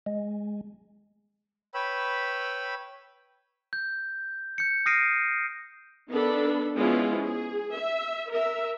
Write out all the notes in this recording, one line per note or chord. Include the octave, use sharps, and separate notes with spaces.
G#3
B4 C#5 G5 B5 E6
G6
G6 C#7
D#6 F6 A#6 C7 D7 D#7
D#3 B3 D4 A4 B5
F3 G#3 B3 C#4 E4 F4
G#4
E5
A#4 E5